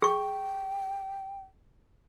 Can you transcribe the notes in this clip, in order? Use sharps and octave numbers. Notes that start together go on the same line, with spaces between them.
G#4 G5 C#6